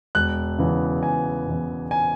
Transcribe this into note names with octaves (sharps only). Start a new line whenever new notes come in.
E1 F#6
E2 C#3 E3 B3
E1 G#5
E2 C#3 E3 B3
G#5